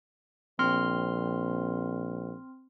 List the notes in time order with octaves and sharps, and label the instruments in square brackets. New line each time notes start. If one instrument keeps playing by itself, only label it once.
[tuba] A#1 [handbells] C4 C6 F6